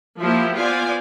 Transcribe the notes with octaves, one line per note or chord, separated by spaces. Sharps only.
F3 A#3 E4 F4 G4 E5
B3 F4 C5 D5 F5 G#5